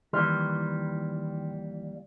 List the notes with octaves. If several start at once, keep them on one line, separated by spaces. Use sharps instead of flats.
D#2 D#3 E3 G3 C6 F6